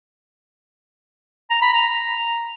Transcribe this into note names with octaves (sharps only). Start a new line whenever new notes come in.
A#5
B5
A#5